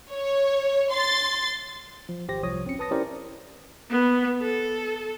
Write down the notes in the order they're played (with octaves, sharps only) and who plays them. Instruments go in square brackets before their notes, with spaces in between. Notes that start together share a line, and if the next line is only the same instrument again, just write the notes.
[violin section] C#5
C6 A6
[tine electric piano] F3
G#1 G4 C5 A#6
C2 F3 C#5 D#6
G#1 C4 C#4 C#7
B4 A5 D#6 A#6
C#4 E4 G4 A#4 C5 D5
[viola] B3
A4